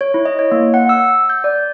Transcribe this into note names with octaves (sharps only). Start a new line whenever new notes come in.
C#5
E4
D#5
C#5
A#3
F#5
E6
G6
D5